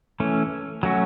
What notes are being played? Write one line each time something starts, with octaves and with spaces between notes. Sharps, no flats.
E3 A3 C#4
F#3 A3 C#4 F#4